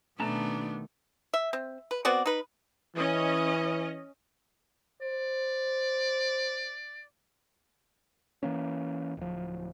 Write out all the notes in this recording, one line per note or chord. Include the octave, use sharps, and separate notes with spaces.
B2 D#3 A3 B3 C#4 D4 A5 A#5
E5
C4
B4
B3 C4 F#4 D5
D#4 B4
E3 C#4 D#5
C5 D5
E3 A#3 C#4
D1 F3